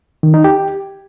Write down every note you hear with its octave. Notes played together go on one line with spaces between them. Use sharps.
D#3
D#4
G4